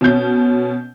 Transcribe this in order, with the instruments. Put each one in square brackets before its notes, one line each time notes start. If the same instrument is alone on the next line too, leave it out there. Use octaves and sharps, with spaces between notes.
[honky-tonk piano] B2 C#4 G6